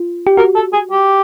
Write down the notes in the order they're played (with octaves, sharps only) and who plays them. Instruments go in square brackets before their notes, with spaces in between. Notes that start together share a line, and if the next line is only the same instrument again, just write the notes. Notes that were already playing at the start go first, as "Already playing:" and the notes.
Already playing: [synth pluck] F4
G4
[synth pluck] F#4 [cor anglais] A#4
[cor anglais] A4
G#4
G4